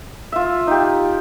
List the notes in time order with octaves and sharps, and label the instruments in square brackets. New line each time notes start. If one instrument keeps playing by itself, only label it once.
[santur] F4 E5
D#4 G4